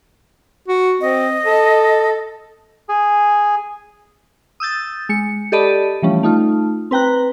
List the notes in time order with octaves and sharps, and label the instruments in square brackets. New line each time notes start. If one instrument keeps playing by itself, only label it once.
[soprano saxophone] F#4
[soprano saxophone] C4 [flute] D#5
[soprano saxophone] A4
[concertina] G#4
[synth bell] D#6 E6 G6 A6
G#3 C#7
G4 A4 D5 D#5 A5 B5
E3 F3 G3 A3 C#4
A3 D#4 F4
C4 B4 G5 A#5 F#6